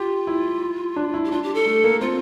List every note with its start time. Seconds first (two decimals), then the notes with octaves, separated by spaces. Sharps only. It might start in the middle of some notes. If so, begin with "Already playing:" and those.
Already playing: F4 G4
0.27 E4
0.96 D4
1.14 E4
1.25 G4
1.31 D4 F4
1.43 G4
1.55 A4
1.66 A3
1.84 A#3
2.01 C4 F4